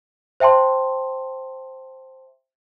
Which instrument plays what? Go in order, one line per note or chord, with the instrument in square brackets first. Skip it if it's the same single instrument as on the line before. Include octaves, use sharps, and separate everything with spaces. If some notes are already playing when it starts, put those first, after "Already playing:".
[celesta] C5 E5 G5 A5 C6